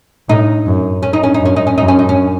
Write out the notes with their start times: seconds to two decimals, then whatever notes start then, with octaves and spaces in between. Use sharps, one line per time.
0.29 A2 D#4
0.66 F#2
1.03 C#4
1.13 D#4
1.23 C#4
1.34 D#4
1.40 F#2
1.45 C#4
1.56 D#4
1.67 C#4
1.77 F#2 D#4
1.88 C#4
1.99 D#4
2.09 C#4